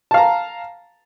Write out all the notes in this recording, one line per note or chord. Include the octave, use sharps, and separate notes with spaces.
F5 A5 A#5